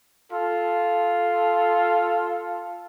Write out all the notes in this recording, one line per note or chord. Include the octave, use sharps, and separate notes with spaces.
F4 A4